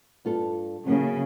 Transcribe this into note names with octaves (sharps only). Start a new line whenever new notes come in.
G2 F4 A4
C#3 F#3 A#3 E4